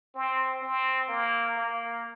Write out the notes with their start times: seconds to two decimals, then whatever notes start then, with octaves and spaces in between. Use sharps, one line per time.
0.15 C4
0.62 C4
1.09 A#3
1.57 A#3